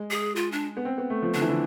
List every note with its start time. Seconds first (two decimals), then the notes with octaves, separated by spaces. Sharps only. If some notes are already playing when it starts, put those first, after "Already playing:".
Already playing: G#3
0.11 G#4
0.36 F4
0.52 D4
0.77 B3
0.85 C4
0.98 B3
1.10 A3
1.23 F3
1.34 D3 D4
1.42 E3
1.49 D3